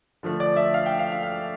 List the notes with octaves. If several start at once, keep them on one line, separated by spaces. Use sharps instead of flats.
D3 F3 A3
D5
E5
F5
G5
F5
F5
F5